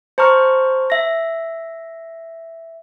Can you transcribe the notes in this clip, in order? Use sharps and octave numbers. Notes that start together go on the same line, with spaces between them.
C5 A5 A#5 C#6 F6
E5 A#6